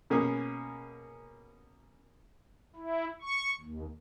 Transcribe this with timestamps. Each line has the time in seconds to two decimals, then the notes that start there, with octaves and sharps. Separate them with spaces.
0.10 B2 A#3 C#4 G#4
2.76 E4
3.21 C#6
3.61 D#2